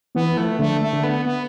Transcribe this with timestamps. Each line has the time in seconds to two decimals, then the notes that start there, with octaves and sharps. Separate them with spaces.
0.15 E3 B3
0.37 F3 A3
0.59 D3 A3
0.81 A3
0.93 D3
1.03 B3
1.25 B3